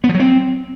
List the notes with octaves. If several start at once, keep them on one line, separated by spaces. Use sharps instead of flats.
B3
F3
F#3
C4